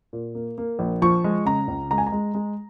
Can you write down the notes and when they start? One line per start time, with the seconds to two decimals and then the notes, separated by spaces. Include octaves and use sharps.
0.13 A#2
0.35 A#3
0.58 A#3
0.79 A#1
1.02 F3 C#6
1.24 G#3
1.45 C#3 A#5
1.68 C#2
1.91 G#3 A#5
1.98 G#5
2.07 A#5
2.12 G#3
2.34 G#3